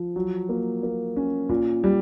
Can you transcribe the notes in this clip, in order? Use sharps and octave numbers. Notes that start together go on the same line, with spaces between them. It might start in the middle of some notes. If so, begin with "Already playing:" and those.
Already playing: F3
F#3
A#3
A#3
C#4
A#2
G3